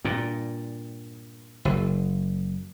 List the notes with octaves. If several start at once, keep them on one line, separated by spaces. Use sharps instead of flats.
G2 A#2
F#1